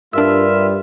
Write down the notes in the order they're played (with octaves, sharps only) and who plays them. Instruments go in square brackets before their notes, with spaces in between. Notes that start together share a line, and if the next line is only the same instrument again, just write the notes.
[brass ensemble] G2 G3 [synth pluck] D4 E6 [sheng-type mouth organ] F4 E5 [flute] A#4